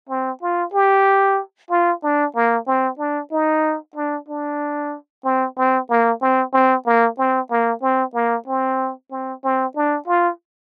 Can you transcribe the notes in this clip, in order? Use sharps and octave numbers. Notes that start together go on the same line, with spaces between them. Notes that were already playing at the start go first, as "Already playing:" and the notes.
C4
F4
G4
F4
D4
A#3
C4
D4
D#4
D4
D4
C4
C4
A#3
C4
C4
A#3
C4
A#3
C4
A#3
C4
C4
C4
D4
F4